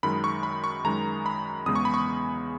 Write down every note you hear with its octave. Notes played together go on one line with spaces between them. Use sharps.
F#2 D#3 G#3 B5
C#6
B5
C#6
F#2 D#3 G#3 A#5
B5
E2 C#3 G#3 D#6
C#6
B5
C#6